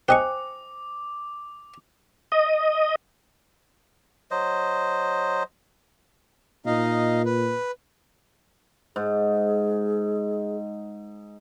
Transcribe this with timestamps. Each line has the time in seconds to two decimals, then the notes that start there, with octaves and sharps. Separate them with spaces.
0.09 G4 C5 D#5 G5 G#5 C#6 D6
2.32 D#5
4.31 F#3 C5 D#5
6.66 A#2 D#4 D#5 F5
7.25 B4
8.96 G#2 G#4